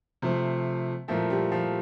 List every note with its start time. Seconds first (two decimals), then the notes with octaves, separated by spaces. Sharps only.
0.22 C3 F3 A3
1.08 A#2 F3 A3 E4 A#4 E5
1.30 G3
1.52 F3